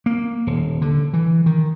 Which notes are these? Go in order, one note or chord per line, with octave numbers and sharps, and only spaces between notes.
A#3
D#1
D3
E3
D#3